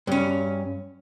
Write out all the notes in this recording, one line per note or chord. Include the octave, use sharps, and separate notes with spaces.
G2 C#4